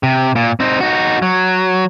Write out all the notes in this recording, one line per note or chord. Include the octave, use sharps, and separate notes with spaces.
C3
A#2
C4 D#4
D#4 F#4
F#3